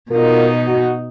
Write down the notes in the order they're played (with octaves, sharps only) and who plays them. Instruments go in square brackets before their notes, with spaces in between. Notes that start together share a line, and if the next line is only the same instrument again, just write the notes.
[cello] B2 D#4 [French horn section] F4 F#4 A#4
[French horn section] F#4